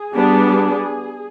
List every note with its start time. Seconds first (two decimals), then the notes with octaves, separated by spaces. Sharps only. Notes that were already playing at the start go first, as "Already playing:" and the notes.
Already playing: G#4
0.13 G3 B3 D4